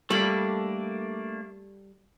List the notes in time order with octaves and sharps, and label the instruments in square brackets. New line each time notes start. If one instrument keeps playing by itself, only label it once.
[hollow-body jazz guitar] G3 [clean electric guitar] A3 A#3 D4 [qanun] A4 B5